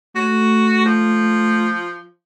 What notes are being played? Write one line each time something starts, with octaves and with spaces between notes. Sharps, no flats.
A3 F#4
F3